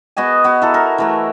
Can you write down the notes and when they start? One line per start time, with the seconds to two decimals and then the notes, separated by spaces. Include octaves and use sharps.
0.17 B3 F#4 D#5 G#5
0.44 B3 F#4
0.62 E4 A4 A#5
0.74 A#4
0.98 E3 A3 A#4